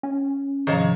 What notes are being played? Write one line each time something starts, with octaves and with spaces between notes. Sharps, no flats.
C#4
G#2 C3 D#3 F3 C#5 A#5